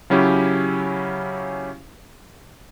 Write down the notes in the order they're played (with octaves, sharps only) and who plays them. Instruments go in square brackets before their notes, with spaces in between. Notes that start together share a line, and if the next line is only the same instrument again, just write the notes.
[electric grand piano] C#3 F#3 C#4 E4 G4